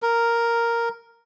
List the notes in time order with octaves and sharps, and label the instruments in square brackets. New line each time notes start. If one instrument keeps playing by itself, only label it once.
[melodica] A#4